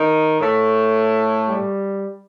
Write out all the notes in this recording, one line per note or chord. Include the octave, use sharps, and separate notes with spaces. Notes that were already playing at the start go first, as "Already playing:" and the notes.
Already playing: D#3 D#4
A2 A3
G3